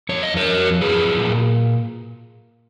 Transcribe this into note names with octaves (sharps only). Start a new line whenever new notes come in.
F2 C#5
D#5
A#4 C#5
F3
F#3 G#4 B4
A#2